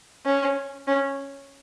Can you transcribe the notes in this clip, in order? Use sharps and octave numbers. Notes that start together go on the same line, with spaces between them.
C#4
C#4